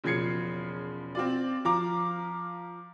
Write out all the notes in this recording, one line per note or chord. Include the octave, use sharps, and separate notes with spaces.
E1 C#3 F3 G#6 C7 C#7
C4 F4 D5
F3 F5 A#5 D6